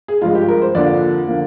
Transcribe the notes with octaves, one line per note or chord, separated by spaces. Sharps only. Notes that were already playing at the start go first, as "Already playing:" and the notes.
G#4
G2 F3 G#3 F4
G4
A#4
C5
F2 D3 F3 A#3 D5
D3 F3 A#3